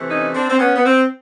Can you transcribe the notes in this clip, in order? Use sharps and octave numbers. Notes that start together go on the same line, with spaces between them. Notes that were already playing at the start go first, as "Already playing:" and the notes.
Already playing: C3 E3 A3
C#4 D#4
C4 D4
C4
B3 C#4
B3
C4